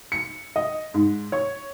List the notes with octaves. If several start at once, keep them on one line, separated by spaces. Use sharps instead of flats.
C#7
D#5
G#2
C#5